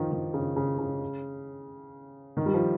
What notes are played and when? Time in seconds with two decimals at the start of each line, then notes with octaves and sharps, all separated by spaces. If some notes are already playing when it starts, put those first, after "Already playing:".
Already playing: D#3 F3
0.12 D#3
0.34 C#3
0.56 C#3
0.79 C#3
2.37 D#3
2.46 G3
2.54 F3